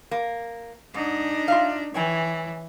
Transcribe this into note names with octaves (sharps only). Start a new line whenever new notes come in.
A#3
G#2 D4 D#4
F4 E5 F5
E3 C#5 G5 G#5